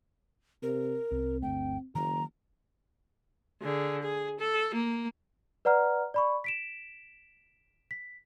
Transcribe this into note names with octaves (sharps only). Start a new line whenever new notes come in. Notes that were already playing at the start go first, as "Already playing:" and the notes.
C3 A#4
C2 C4
G1 D2 A3 G5
F#1 D#3 F#3 A#3 A#5
D3 G#4
G#4
A4
A#3
B4 D5 F#5 A#5 F6
D5 B5 C#6
B6 D7 E7
B6